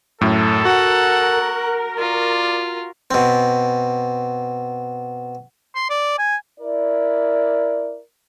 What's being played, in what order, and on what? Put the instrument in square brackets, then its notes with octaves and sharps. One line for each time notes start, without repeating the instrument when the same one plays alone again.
[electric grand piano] F#2 A2 [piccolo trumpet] A4
[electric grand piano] F#4 [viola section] A#4 [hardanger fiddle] F#5
[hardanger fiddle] F4 [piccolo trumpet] D5
[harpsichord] B2 C4
[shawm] C6
D5
G#5
[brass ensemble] E4 A#4 D5